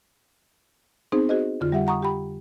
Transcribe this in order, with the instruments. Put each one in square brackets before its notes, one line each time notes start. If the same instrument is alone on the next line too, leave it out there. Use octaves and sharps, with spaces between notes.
[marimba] B3 C4 D#4 G#4 C5
F#4 G#4 C5 D#5
F2 D3 F4
G3 G4 E5 F#5
F#5 A#5 C#6 D#6
G4 G5 B5